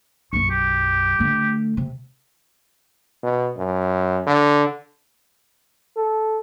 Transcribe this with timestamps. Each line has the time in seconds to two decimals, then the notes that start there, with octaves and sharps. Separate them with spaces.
0.33 B1 F#2 C#6
0.50 G4
1.19 D3 A3
1.77 C3
3.23 B2
3.57 F#2
4.27 D3
5.97 A4